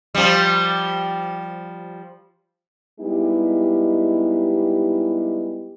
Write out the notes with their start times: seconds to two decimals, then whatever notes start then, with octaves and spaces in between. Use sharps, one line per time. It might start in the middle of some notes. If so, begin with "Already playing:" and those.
0.15 F3 G3
3.00 G3 G#3 B3 D#4 E4 G4